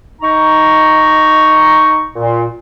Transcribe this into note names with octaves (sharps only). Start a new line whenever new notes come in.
D#4 A#5 C#6
A#2